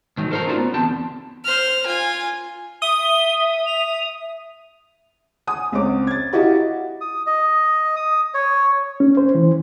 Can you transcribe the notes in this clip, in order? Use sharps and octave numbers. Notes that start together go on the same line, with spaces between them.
G#2 D#3 F#3
A4 A#4 C5 D5 F#5 A#5
A3 C#4 D#4 F4 F#4 D5
B3
E2 D3 C4 G4 A5
C5 F6
F4 G#5
E5 D#6 G7
F7
F#5 G#5 D#6
C#2 C4 C#5 D6
G#6 A6
E4 F#4 G4 D#5 F5
D#6
D#5
D#6
C#5
C#4
C5
E3